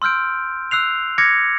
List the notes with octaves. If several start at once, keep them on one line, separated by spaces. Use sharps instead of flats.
C6 E6 F6 G6 D7
E6 F#6 C7 F7
D6 F6 G#6 A#6 C#7